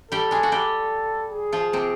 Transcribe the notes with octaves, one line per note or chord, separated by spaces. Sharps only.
G3 G4 A4
G#3 G#4
F#4
G3 G4 A4
G#4
F3 F4
C3 C4